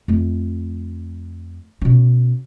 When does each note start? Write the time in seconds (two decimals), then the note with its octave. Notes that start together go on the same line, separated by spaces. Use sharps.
0.08 F2 A3
1.82 B2 C#4